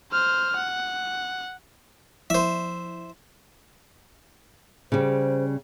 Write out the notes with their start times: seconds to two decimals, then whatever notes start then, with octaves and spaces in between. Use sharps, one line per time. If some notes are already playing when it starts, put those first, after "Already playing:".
0.12 C5 F6
0.56 F#5
2.30 F3 E4 C5 E5
4.92 C#3 G3 C5